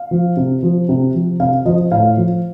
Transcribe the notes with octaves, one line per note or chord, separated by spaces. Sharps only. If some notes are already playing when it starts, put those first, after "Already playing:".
Already playing: F5
F3
C3
F3
C3
F3
C3 F5
F3 D#5
A2 F5
F3